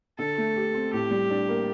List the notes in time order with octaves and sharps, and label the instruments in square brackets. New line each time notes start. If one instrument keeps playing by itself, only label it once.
[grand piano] D3 [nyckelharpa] A4
[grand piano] A3
G4
C4
[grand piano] A2 [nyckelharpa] G4
[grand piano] G3
D4
A#3